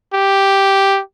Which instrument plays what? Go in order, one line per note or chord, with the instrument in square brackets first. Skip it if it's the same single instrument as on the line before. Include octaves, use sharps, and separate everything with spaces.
[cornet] G4